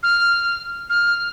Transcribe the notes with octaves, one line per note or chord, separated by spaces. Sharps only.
F6
F6